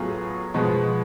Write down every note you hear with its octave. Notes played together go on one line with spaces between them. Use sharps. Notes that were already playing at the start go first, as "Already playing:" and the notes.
Already playing: A2 F#3 B3 F4 G#4
B2 F3 G#3 B3